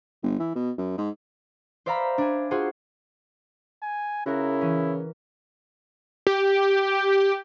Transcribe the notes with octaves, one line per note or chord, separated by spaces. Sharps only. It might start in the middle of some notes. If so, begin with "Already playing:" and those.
G1
E3
B2
F#2
G#2
C5 D5 E5 F5 A#5 B5
D4 G#5
F4 F#4 G#4 C5
G#5
C#3 E4 F#4 A#4
E3 C#4
G4